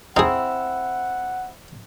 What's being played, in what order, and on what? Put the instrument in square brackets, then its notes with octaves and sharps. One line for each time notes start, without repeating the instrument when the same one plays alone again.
[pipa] C4 E4 [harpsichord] D#4 G#4 [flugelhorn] F#5